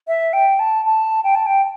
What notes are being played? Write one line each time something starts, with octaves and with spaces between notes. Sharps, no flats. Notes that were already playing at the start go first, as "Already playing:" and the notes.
E5
G5
A5
A5
G5
A5
G5